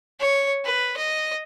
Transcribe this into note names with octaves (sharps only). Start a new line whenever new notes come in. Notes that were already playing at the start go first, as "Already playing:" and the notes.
C#5
B4
D#5